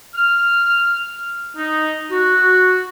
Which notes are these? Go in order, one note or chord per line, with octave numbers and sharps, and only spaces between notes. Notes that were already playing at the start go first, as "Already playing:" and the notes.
F6
D#4
F#4